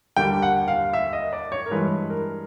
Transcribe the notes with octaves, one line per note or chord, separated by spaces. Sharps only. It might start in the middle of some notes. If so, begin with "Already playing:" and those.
D#2 D3 G3 A#3 G5
F#5
F5
E5
D#5
D5
C#5
A#4
G2 E3 G#3 B4
A#4